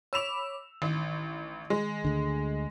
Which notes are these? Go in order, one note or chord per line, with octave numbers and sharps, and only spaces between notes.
C#5 B5 D6 E6 E7 F7
A1 D#3
G#3
D2 D3